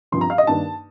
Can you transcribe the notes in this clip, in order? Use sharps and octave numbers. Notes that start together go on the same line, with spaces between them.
G2 F3 C4 C6
A#5
F5
D#5
G2 D#3 A#3 D4 A5